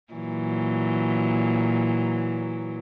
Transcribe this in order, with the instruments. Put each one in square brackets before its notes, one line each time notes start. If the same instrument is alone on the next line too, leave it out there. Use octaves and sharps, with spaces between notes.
[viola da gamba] A#2 E3 F#3